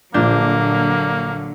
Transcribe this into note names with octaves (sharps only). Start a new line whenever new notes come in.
A#1 D3 F3 F#3 A#3 D4 G6